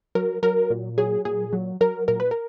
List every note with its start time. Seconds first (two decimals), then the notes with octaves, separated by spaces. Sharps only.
0.15 F#3 A#4
0.43 F#3 A#4
0.70 A#2
0.98 F#3 G#4
1.25 A#2 G#4
1.53 F#3
1.81 F#3 A#4
2.08 A#2 A#4
2.20 B4
2.31 A#4